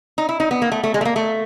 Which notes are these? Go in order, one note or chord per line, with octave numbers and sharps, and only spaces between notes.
D#4
E4
D#4
B3
A#3
A3
A3
G#3
A3
A#3
A3